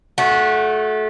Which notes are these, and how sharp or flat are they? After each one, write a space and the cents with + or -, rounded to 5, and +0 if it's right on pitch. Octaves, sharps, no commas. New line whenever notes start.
A3 -25 F#4 -10